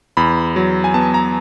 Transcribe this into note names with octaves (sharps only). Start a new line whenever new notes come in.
E2 B5
F#3
G#5
B3 A5
A#5